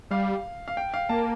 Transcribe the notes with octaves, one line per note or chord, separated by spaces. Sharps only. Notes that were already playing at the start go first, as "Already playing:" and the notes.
G3 F5
F5
G5
F5
A#3 A5